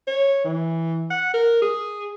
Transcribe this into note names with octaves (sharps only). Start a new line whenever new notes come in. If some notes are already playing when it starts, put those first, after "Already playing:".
C#5
E3
F#5
A#4
G#4